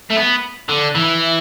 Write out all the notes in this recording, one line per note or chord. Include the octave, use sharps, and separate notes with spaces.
A3
B3
D3
E3